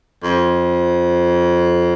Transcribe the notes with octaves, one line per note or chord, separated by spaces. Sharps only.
F2